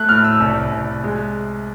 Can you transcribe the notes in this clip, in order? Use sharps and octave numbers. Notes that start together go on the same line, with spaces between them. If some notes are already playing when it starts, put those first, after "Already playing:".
Already playing: A3 F#6
A2 F6
E6
C2
C2
G#3